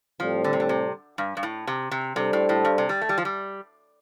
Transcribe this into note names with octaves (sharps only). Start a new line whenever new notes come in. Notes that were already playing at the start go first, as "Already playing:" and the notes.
A2 F3 G3 C4 A4
D3
C3
D3
C3
G2
G2
A2
C3
C3
C3 G3 D4 A4 C5
A2
A2
G2
C3
G3
A3
G3
F3
G3